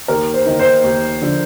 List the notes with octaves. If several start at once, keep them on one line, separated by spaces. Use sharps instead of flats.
D#2 A#4
C5
D#3 A#3 D#4
C5
D#2
D3 F3